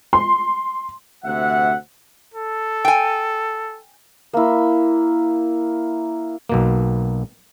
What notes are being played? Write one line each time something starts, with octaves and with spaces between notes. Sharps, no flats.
C6
D2 C3 E5 F#5
A4
G5 G#5
A#3 E4
B1 B2 A#3